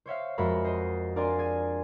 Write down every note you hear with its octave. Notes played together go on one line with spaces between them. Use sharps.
C5 C#5 E5 F5
F2 G#3 F#4 A#4 E5 B5
C5 D#5
D4 A#4 D5 F5 G#5 C6
G#4 G#5